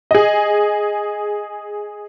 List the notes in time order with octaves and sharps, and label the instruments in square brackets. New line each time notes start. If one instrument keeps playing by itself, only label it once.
[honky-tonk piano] G#4 D#5